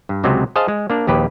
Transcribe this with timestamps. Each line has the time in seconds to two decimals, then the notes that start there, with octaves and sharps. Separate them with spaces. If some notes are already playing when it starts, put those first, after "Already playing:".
0.09 G2
0.24 C#2 C3 F#3 G#3 C4
0.56 G#4 C5 D#5 F5 A5
0.68 G#3
0.90 A#3 D4
1.07 A#1 D#2 G4 B4